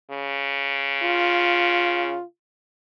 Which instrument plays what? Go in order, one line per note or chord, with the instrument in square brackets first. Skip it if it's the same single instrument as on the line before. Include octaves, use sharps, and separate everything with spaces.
[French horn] C#3
[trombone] F4